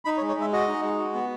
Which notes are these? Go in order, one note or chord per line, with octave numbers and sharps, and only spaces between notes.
D#4 B5
C#5
G#3
C#5
G#3 E5
F#4 D#5
D#4
G#3
F#4
B3